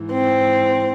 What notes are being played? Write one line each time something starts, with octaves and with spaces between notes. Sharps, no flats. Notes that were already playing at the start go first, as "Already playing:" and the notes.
Already playing: G#2 E3
C4